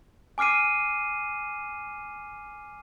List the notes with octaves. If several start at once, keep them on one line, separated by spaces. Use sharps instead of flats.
G#5 D6 F6 C7 D#7